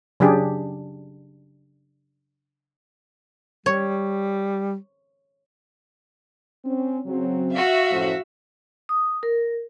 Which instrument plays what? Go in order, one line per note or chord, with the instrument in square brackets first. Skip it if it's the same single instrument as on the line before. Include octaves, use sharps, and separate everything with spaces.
[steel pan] C#3 F#3 D4 G4 G#4
[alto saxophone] G3 [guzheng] C#5
[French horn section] C4 C#4
C#3 F#3 C4
[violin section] F#4 E5 F5
[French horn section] F#2 A2 F3
[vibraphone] D#6
A#4